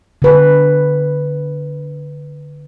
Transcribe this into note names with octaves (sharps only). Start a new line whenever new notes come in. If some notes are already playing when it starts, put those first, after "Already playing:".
D3 B4